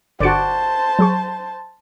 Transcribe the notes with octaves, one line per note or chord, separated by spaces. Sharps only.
G1 D3 F#4 C5 D5 A5 C#7
F#3 G#4 C#6